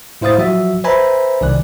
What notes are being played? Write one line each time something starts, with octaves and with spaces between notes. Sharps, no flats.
A2 E4 C5 F5 D#6 A6
F3 F#3 F#4 E5
B4 C5 E5 G#5 A#5 B5
C2 D#3 D5 F#6